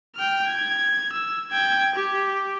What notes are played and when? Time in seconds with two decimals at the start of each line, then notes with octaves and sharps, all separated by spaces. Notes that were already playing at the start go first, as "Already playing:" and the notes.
0.15 G5 F6
0.46 G#6
1.12 E6
1.51 G5 G#6
1.95 G4